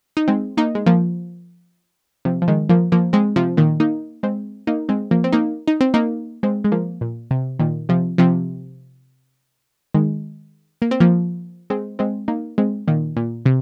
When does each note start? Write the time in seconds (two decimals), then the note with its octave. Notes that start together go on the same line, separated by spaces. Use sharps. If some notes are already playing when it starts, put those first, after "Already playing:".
0.17 D#4
0.28 G#3 C4
0.57 A#3 D#4
0.75 G#3
0.86 F3 A#3
2.25 C3 F3
2.42 F3
2.48 D#3 G#3
2.69 F3 A#3
2.92 F3 A#3
3.13 G#3 C4
3.36 C3 F3
3.57 A#2 D#3
3.80 A#3 D#4
4.23 G#3 C4
4.67 A#3 D#4
4.89 G#3 C4
5.11 F3 A#3
5.24 C4
5.33 A#3 D#4
5.68 D#4
5.81 C4
5.94 A#3 D#4
6.43 G#3 C4
6.64 G#3
6.72 F3 A#3
7.01 A#2
7.31 C3
7.59 A#2 D#3
7.89 C3 F3
8.18 C3 F3
9.94 D#3 G#3
10.82 A#3
10.91 C4
11.00 F3 A#3
11.70 G#3 C4
11.99 G#3 C4
12.28 A#3 D#4
12.58 G#3 C4
12.88 A#2 D#3
13.16 A#2
13.46 C3